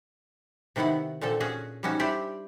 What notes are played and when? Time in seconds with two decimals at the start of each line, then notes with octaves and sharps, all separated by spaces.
0.76 C3 D#3 B3 E4 F#5
1.21 A#2 D3 C4 A4
1.40 C#4 F#4 G#4
1.83 G3 C4 C#4 D#4 F#4
1.99 D4 E4 G4 C5 D5